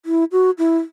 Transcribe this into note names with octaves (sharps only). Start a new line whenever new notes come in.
E4
F#4
E4